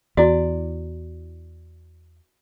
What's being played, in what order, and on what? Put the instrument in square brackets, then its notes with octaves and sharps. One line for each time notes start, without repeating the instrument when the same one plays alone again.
[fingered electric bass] E2 [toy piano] E4 F#4 [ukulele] D5